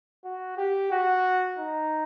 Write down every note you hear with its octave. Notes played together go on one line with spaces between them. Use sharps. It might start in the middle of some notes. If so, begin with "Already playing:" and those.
F#4
G4
F#4
D#4